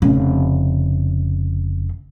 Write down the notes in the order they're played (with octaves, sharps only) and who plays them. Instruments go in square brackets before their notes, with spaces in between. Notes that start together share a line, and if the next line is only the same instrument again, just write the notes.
[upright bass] F1 C#3